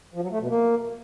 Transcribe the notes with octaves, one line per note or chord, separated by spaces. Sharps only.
F3
F#3
A3
B2
A#3